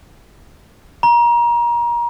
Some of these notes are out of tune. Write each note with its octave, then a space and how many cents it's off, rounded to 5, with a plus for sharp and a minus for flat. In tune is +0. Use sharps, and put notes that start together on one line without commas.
A#5 +30